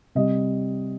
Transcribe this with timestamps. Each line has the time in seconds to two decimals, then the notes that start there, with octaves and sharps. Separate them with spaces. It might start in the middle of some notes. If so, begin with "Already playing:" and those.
0.15 C3 G3 D#5